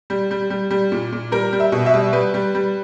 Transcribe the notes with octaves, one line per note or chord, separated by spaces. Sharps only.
G3
G3
G3
G3
A#2
A#2
G3 A#4
G3
E5
B2
E5
G3
G3 B4
G3
G3